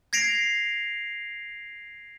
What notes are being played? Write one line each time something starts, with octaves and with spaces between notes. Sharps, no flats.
G#6 A#6 C7 D7 F7